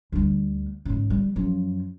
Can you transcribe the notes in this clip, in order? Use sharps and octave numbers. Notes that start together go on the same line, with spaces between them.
D2 G3
G#2 C#3
G3
F#2 F3